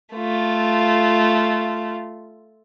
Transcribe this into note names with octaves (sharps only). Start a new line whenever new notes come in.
A3 F4